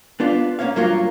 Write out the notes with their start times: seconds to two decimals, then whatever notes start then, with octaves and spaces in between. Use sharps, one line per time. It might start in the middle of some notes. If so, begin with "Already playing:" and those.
0.20 B3 D4 F4 D5
0.59 A#3 C#4 C#5 F5
0.76 G2 F#3 A#3 F4 A#4 C#5